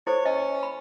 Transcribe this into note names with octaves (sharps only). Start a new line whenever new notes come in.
E4 A4 C5 C#5
C#4 D#5
B5